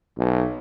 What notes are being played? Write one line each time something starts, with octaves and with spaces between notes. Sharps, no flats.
B1